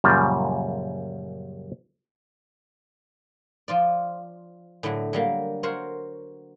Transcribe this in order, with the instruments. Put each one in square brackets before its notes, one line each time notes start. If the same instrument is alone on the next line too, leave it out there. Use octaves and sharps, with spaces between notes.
[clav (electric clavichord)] F#2 A#2 C#3 F3 G3 A#3
[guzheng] F3 F4 D5
A2 D3 F#3 A3
F#3 G3 A#3
F#4 A#4 C5 C#5